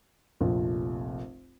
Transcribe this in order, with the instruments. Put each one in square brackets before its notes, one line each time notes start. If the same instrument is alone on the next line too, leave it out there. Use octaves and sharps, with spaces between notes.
[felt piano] F1 A#1 F2